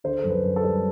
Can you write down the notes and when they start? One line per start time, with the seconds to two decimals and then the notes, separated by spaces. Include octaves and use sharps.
0.04 D3 C5
0.19 F#2 A4
0.30 B4
0.43 F#2
0.56 A4
0.63 G3